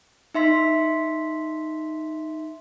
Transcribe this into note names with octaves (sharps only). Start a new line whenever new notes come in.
D#4 E5 C6 B6